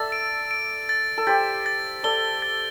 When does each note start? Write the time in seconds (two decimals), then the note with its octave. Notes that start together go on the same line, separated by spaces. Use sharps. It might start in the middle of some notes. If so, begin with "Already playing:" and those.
Already playing: A4 D5 E5 A6
0.12 D7
0.51 D7
0.89 A6
1.18 A4
1.27 G4 C5 A6
1.66 A6
2.03 A4 D5 G7
2.42 A6